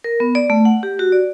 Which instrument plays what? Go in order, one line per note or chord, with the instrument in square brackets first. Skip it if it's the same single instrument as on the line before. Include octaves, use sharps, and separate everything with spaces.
[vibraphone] A#4
B3
D5
A3
F#5
G4
F#4
D5